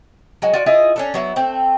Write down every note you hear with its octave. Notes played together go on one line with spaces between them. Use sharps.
F#3 G#3 F#4
F4 F#4 D5
E4 F4 G#4 D#5
C#4 D4 A4
F#3 B3 E4
A3 C4